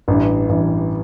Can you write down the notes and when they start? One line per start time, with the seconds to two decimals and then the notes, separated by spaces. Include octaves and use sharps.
0.08 A1 G2 E3
0.49 A1 G2 E3